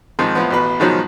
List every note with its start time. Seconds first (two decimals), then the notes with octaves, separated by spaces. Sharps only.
0.19 G#2 D#3 F3 C4
0.35 A2 F3 B3
0.51 A1 B2 B4
0.80 G#2 B2 D#3 F3 F#3